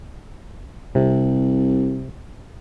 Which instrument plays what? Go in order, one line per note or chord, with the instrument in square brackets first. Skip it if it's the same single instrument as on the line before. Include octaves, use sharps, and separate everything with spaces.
[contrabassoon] C2 [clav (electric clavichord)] C3